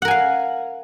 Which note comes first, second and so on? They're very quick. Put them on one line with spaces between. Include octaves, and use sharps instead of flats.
F#5 A#4 G#5 F5